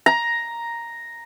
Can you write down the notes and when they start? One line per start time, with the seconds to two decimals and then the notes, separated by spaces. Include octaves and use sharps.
0.06 A#5